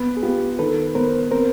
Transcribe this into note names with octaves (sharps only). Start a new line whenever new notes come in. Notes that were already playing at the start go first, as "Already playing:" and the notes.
Already playing: B3
G#4
B3 F4 G4
D#3 A4 B4
B3 A#4 C5
C4 A#4 C5